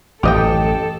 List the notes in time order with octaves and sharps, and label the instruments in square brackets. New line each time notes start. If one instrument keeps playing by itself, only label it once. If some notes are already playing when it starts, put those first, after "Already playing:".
[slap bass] A1 F#2 [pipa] G4 D#5 G5 [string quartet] A4